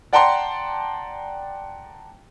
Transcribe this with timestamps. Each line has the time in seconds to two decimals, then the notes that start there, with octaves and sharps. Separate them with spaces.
0.13 D5 F#5 G5 A5 A#5 C6